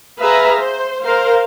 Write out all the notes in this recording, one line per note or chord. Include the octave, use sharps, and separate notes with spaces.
G#4 B4 E5 F5 A#5
C5
A#4 C5 F5